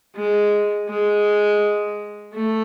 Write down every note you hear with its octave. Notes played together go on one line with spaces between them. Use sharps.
G#3
G#3
A3